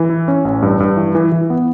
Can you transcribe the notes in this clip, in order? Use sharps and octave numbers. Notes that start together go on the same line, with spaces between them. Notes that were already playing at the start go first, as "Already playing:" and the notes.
Already playing: E3
E4
C#4
A1
G2
G2
E3
E3
E3
B3